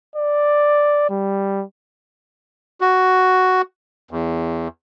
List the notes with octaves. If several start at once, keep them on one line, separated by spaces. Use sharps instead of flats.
D5
G3
F#4
E2